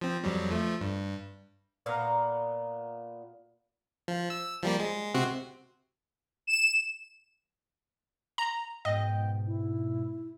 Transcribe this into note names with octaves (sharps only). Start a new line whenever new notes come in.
F3 C4
F2 F#3 G3
F3 A3
G2
A#2 B3 F5 A#5
F3
E6
F3 G3 A#3
G#3
C3 C4 F#4
E7
A#5
G#2 B2 D#5 G5
E4